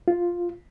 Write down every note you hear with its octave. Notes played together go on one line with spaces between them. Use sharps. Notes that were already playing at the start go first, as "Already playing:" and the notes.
F4